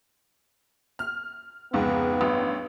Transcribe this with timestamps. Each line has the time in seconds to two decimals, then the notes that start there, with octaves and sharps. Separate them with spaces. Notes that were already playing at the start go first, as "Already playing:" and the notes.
0.99 F6
1.73 F1 C#2 G#2 B3
2.21 A1 G2